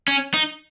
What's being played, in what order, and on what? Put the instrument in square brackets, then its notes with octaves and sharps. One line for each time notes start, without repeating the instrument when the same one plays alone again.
[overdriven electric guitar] C#4
D#4